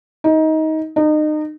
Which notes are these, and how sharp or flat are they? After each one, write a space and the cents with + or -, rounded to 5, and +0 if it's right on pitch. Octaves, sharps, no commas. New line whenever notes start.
D#4 +20
D#4 -30